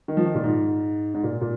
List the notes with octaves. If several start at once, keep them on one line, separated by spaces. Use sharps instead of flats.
D#3
F3
D#3
A#2
G#2
G#2
A#2
A#2